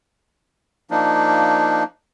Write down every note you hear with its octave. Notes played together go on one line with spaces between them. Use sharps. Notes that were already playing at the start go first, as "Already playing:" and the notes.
F3 A#3 D4 D#4